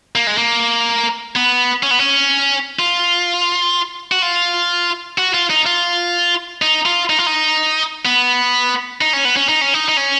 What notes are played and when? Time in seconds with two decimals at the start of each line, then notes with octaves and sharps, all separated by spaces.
0.15 A#3
0.27 G#3
0.38 A#3
1.36 B3
1.83 C#4
1.91 B3
1.99 C#4
2.79 F4
4.12 F#4
4.22 F4
5.18 F#4
5.34 F4
5.50 D#4
5.66 F4
6.62 D#4
6.86 F4
7.10 D#4
7.19 F4
7.26 D#4
8.05 B3
9.01 D#4
9.13 C#4
9.25 B3
9.36 C#4
9.49 D#4
9.61 C#4
9.74 D#4
9.89 D#4
9.97 C#4